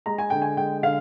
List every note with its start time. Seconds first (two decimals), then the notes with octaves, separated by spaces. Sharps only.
0.06 G#3 A#5
0.18 G#5
0.30 D3 G5
0.42 G#5
0.57 G#3 G5
0.83 D3 F5